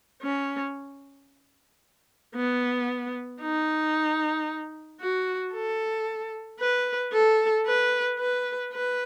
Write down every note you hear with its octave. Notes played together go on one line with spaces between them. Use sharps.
C#4
B3
D#4
F#4
A4
B4
A4
B4
B4
B4